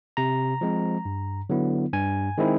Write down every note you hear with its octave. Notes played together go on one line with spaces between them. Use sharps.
C3 A#5
F3 G#3 C4
G2
D3 F#3 B3 E4
G2 G#5
D#3 G#3 C4 E4